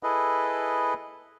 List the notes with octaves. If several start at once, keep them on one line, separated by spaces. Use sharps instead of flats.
E4 G#4 A4 B4 D#5